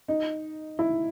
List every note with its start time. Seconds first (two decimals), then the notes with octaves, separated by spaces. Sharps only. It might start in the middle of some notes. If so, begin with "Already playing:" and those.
0.08 D#4
0.79 E4